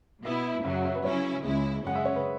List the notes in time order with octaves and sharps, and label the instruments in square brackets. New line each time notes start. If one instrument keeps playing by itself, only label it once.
[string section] B2 B3 E4 [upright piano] E5
[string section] F#2 C#3 F#3 [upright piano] E5
[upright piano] F#5
E5
B4
[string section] C#3 F#3 C#4 E4 [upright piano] C#5
[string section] C#2 C#3 G#3 E4
[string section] F#2 C#3 G#3 C#4 [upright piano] F#5
[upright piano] E5
C#5
B4